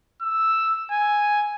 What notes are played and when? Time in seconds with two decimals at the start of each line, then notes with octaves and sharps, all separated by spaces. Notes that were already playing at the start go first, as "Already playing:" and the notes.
0.22 E6
0.91 G#5